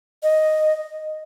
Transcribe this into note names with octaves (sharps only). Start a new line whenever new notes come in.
D#5